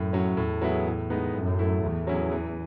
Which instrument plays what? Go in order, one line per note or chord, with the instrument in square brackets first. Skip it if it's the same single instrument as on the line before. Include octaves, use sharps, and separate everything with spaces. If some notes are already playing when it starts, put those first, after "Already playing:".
Already playing: [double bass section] F#2 [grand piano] A2
[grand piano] F#3 C#4
[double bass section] E2 [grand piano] A2
[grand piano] F#3 B3 E4 G#4
A2
G#3 B3 D#4
[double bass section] F#2 [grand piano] A2
[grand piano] F#3 A3 E4
[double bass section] E2 [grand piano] A2
[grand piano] F#3 C#4 E4 G#4
E3